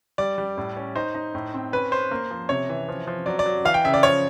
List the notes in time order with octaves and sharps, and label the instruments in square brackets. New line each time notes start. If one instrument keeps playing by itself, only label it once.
[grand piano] G3 D5
G3
A2
C#4
D#4 C5
D#4
A2
C4
C#4 B4
C#4 C5
A#3
F3
C3 C#5
E3
F3
F3
F#3 D5
D5
F#3
E3 F5
G5
C#3 E5
D5
F3 C#5